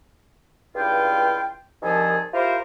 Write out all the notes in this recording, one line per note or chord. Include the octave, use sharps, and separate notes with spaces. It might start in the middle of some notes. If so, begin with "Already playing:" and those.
C#2 G2 E4 F4 G5
C2 D#3 F3 G#4 A4 G#5
E4 F4 G4 A#4 C5